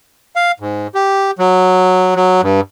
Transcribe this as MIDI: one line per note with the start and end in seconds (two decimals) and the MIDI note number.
0.36 0.52 77
0.60 0.87 44
0.95 1.31 67
1.39 2.15 54
2.16 2.41 54
2.43 2.61 43